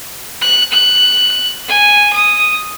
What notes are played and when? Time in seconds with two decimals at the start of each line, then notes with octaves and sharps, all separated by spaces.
0.41 F#6
0.72 F#6
1.68 G#5
2.13 D#6